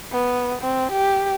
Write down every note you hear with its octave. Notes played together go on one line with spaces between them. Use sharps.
B3
C4
G4